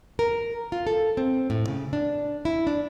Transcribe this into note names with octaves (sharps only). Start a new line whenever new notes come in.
A#4
F4
A4
C4
A2
C#3
D4
E4
D4